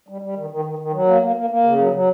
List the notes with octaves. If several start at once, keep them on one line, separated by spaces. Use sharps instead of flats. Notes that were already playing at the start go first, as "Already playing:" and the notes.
G3
G3
D#3
D#3
D#3
D#3
F#3
A#3
A#3
A#3
A#3
C#3
F#3
F#3